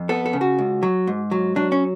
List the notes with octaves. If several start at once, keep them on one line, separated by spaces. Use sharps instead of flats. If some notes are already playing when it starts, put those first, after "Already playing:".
Already playing: F2
B3 A4
A4
C#3
F#4
C#2
F#3
G#2
F#3
F#3 D4
C#4